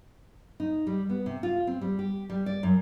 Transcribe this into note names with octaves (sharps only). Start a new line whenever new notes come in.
D#4
G3
B3
C3
F4
C4
G3
G4
G3
D5
F#2